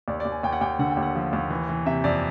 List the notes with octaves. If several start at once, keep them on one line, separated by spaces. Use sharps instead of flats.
D#2 D5
D5
D#2
G#5
D#2 G5
F#5
D#2 G5
D3 F#5
G5
D#2
F#5
F3
D#2
E3
E3
C3 E5
F2 D5